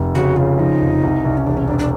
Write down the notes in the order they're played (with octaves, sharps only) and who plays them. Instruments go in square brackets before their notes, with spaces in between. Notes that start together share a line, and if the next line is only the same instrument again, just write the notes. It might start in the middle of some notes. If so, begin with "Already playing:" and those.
Already playing: [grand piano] F1
[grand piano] C#3 [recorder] F#4
[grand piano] C#3 [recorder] F4
[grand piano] F3 [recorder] D#4
[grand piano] F1
C2
C2
[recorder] C#4
[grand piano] E1 [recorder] D4
[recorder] C#4
[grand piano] E1 [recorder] D4
[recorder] D4